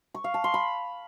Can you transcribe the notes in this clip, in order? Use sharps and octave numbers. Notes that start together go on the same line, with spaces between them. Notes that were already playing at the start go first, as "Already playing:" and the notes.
C#6
F5
A5
C6
B5